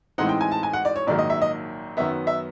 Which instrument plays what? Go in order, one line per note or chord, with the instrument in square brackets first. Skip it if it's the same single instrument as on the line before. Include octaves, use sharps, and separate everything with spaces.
[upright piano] A2 E3 G#3 C4 D#4 F#5
G5
G#5
A5
G#5
F#5
D5
C#5
A#1 G#2 D#3 F#3 A#3 D5
D#5
E5
D#5
F#2 D#3 F#3 B3 E5
E5